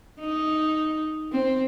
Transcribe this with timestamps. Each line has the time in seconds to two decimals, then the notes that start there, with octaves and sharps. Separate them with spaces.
0.20 D#4
1.32 C4